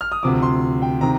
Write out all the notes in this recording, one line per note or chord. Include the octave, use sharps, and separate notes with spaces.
F6
D#6
D2 C3 F3 D6
C6
G5
C3 D#3 A#5